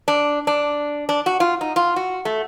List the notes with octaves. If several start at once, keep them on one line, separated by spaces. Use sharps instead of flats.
D4
D4
D4
F#4
F4
D#4
F4
F#4
A3